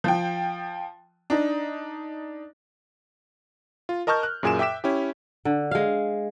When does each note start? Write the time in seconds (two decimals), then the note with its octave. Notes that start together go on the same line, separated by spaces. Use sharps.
0.04 F3 G5
1.30 D4 D#4
3.89 F4
4.07 A#4 D#5 A5 C#6 F6 G6
4.23 F#6
4.43 F#2 A#2 G#4 G#5 D7 E7
4.59 E5 G5 D6 B6 E7
4.84 C#4 E4 G4
5.45 D3
5.71 G#3 F5